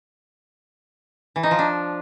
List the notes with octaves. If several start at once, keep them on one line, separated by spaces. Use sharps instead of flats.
E3
D#4
F3
D4